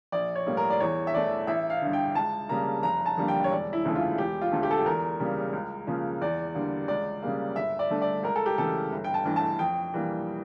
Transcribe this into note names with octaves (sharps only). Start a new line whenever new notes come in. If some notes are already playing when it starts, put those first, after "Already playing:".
A#1 D5
C#5
A2 G3 A#3
A#4
D5
E2 C#5
E5
E3 A3 D5
A1 E5
F5
G2 D3
G5
C#2 A5
C#3 G3 A#3 A#5
F1 A#5
A5
F2 D3 G3 A#3
G5
C#5
E1 D5
E4
D2 C#3 E3 A3
F4
E1 G4
F4
D2 D3 A3
G4
A4
G4
E2 A#4
C#3 G3 A#3
C#2
C#3 F3 A#3
E2 D5
D3 G3 A#3
C#2 D5
C#3 G3 A#3
G1 E5
D5
G2 D3 A3
D5
C#2 A#4
A4
G4
C#3 E3 A3 A4
G1
G5
A5
G2 E3 A3
A5
F2 G5
E3 G3 A#3